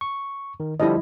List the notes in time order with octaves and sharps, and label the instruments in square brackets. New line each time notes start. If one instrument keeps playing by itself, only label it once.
[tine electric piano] C#6
D#3
[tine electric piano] D3 F3 G3 [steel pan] E4 D#5